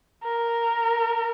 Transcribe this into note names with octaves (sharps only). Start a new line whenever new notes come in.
A#4